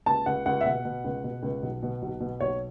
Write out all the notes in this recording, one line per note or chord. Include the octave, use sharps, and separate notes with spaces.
C#2 A5
C#2 F#5
C#2 F#5
E5
B2 F#5
B2
C#2
B2
C#2
B1
B2
B1
B2
B1 C#5